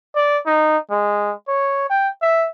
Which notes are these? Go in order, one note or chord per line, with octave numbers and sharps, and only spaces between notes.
D5
D#4
G#3
C#5
G5
E5